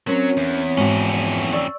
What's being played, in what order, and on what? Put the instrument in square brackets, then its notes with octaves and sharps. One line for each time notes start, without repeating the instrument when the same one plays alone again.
[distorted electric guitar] F#3 [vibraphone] C4 C#5 [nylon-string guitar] C#4 A#4 C5
[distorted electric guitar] E2
[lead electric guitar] F2 C#4 [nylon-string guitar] G#2 F#4
[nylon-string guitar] D5 [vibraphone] C#6 E6